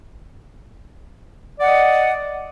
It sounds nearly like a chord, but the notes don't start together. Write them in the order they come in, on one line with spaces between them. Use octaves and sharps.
D5 F#5 D#5